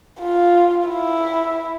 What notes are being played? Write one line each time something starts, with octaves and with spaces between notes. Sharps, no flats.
F4
E4